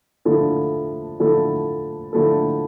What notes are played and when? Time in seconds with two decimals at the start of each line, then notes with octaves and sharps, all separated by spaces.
0.25 D3 F3 A3 E4 A4
1.20 D3 F3 A3 E4 A4
2.13 D3 F3 A3 E4 A4